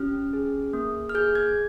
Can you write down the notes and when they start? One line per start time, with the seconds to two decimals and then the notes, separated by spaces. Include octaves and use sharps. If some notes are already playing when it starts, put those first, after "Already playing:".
Already playing: C#4 G4 F6
0.33 G#4
0.73 A#3
1.09 F6
1.15 G#4 G6
1.35 G#6